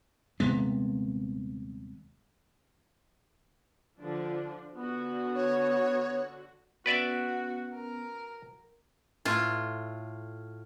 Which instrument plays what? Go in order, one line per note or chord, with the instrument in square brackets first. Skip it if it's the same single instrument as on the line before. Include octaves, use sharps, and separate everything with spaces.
[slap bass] D#1 C3 G#3 B3
[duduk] D3 [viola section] F3 D4
[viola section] D3 F#4 [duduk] B3
[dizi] C#5
[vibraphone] B3 C#4 [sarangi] F#4 [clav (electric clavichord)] B4 D5 E5
[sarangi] A#4
[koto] A2 F4